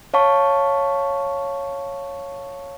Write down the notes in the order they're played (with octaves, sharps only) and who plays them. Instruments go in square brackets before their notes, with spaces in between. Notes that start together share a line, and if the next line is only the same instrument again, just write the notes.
[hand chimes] C#5 F5 A5 C#6